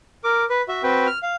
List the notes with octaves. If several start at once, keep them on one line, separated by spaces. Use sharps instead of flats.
A#4 D6
B4
F#4 E5
C4 F#4 B4 G5
F6
F5